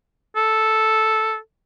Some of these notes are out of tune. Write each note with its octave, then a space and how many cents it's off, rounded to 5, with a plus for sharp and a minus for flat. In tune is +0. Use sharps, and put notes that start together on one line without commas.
A4 -5